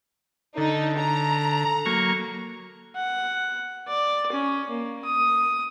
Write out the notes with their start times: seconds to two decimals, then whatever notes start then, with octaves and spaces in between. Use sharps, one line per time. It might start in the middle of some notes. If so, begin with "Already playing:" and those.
0.58 D3 D#4 A4
1.00 A#5
1.86 F#3 A#3 C#6
2.96 F#5
3.88 D5
4.32 C#4
4.69 A#3
5.05 D#6